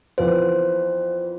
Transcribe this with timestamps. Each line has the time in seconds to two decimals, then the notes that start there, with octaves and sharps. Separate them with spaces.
0.18 F2 E3 B3 F4 B4 C5